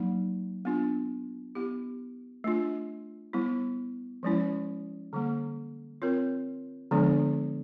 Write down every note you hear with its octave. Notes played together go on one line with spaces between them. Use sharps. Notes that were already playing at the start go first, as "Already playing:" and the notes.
Already playing: F#3 A#3 D#4
B3 D4 F4
B3 E4 G4
A3 D4 F4
G3 B3 E4
F3 G#3 C#4 E4
D3 G3 A#3
C4 F4 A#4 C#5
D3 F3 G#3 B3 D4